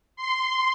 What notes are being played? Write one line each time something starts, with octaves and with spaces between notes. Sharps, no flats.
C6